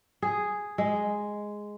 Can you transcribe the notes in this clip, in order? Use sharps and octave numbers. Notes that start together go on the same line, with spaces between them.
G#4
G#3